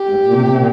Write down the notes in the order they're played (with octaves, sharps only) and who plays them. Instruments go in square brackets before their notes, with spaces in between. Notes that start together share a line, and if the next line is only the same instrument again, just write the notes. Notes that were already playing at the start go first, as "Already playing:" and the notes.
Already playing: [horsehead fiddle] G4
[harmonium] G#2
A#2
C3
A#2
C3
A#2